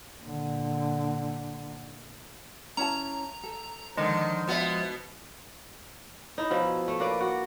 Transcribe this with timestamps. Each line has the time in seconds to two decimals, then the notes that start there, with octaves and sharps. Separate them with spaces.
0.22 A#2 D3
2.77 C#4 E4 A5 A#5
3.43 A4
3.97 D3 D#3 F3 G#3
4.48 B2 B3 F4 E5
6.38 D#4 E4
6.50 B2 F3 E4
6.88 A3
7.00 A#3 B4 D5
7.20 F#4